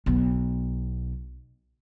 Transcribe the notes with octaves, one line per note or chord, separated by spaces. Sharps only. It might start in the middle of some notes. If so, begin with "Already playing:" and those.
B1 B3